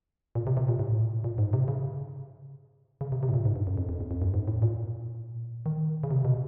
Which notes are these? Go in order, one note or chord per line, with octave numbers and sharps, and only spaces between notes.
A#2
C3
C3
A#2
A2
A#2
G#2
C3
C#3
C#3
C3
C3
A2
A#2
G#2
G2
F#2
F2
F2
E2
F2
F#2
G#2
A2
A#2
D#3
C#3
C3
B2